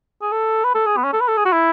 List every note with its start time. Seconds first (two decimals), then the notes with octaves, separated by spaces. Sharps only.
0.22 G#4
0.32 A4
0.64 B4
0.75 A4
0.86 G#4
0.97 B3
1.04 C#4
1.13 A4
1.21 B4
1.28 A4
1.37 G#4
1.45 F#4
1.52 E4